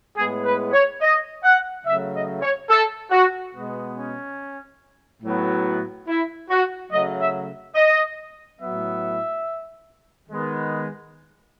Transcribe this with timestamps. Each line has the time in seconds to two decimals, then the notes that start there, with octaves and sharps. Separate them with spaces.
0.17 A2 G#3 B3 G#4
0.45 B4
0.74 C#5
1.02 D#5
1.44 F#5
1.85 C#3 F#3 A3 E5
2.14 D#5
2.42 C#5
2.70 A4
3.12 F#4
3.54 B2 G#3 B3
3.96 C#4
5.23 A2 F#3 B3
6.08 E4
6.50 F#4
6.92 C#3 F#3 A3 D#5
7.20 E5
7.76 D#5
8.60 A2 F#3 B3 E5
10.29 D#3 G#3 B3